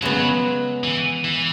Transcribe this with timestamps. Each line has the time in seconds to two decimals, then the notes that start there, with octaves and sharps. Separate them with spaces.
0.02 C#3 F#3 G#3 B3
0.84 E3
1.24 E3